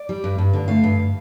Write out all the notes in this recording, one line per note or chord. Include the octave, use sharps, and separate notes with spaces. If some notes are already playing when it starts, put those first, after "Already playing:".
Already playing: D5
G3
G2
G2
D3
A3 F5
G2